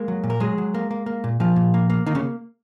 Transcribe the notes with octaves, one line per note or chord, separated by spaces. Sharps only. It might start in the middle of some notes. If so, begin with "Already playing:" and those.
Already playing: G#3 A#3 A#4
F#3
A#2
A#4
F#3 G#3 G#4
F#3
A#3
A#3
A#3
A#2
A#2 F3 F4
A#2
A#3
A#3
D#3 A#3 D#4
C#3 C#4